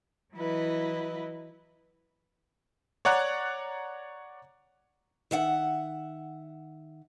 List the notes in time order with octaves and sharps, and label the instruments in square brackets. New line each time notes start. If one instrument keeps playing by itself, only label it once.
[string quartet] E3 F#3 E4 B4 D#5
[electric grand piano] C#5 D5 F#5 A#5 F#6
[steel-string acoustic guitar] D#3 E5 F#5